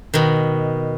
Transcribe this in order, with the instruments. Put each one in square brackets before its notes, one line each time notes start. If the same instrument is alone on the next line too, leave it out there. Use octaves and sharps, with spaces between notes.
[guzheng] B2 D#3